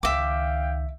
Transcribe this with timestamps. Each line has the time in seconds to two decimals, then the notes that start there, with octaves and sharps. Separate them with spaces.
0.03 C#2 D#3 E5 F5 G5 D6